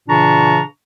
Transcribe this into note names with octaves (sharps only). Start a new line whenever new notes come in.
A#2 C#3 E3 D4 A#5 C#6